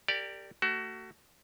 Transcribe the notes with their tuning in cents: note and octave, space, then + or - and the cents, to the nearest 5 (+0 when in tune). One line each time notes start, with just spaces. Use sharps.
G4 +5 A#4 -35 D5 +0
A3 +30 F#4 +25